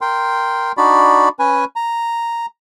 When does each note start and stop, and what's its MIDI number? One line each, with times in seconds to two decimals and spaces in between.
0.01 0.72 70
0.01 0.72 79
0.01 0.72 84
0.77 1.29 62
0.77 1.29 63
0.77 1.29 66
0.77 1.29 74
0.77 1.29 83
1.39 1.65 61
1.39 1.65 71
1.39 1.65 80
1.76 2.46 82